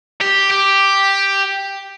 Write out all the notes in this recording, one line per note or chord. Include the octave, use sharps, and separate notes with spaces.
G4
G4